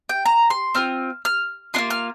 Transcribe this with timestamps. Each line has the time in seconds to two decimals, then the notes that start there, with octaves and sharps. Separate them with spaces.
0.09 G5
0.26 A#5
0.50 C6
0.75 C4 F4 F6
1.25 F6
1.74 D4 F4 C6
1.78 A#3
1.90 F6